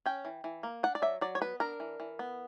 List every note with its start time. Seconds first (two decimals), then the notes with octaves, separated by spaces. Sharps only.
0.06 C#4 G5
0.25 E3
0.44 E3
0.63 A#3
0.83 D4 F#5
0.95 D5
1.02 F#3 E5
1.21 F#3 D5
1.35 C#5
1.41 B3 B4
1.60 D4 A#4
1.80 E3
2.00 E3
2.19 B3